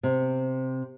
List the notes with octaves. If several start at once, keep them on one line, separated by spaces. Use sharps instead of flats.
C3